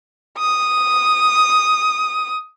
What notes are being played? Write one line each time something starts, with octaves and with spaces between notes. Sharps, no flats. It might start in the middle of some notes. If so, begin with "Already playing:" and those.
D#6